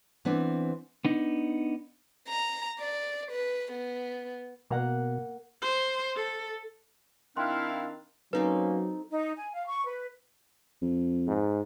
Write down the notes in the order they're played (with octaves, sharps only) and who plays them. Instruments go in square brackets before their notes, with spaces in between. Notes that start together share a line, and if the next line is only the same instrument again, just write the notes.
[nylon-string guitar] E3 B3 C4 D4
[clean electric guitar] B3 D4 D#4
[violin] A#5
D5
B4
B3
[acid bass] B2 [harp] A#3 F5 F#5
[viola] C5
A4
[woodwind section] D#3 C4 D4 [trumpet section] E4 F5 [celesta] G5 C6 F#6
[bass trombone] F#3 [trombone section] A#3 C#4 [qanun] C4 D#4 A4 [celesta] B4
[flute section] D#4
G#5
F5
C#6
B4
[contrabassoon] F2
[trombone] G#2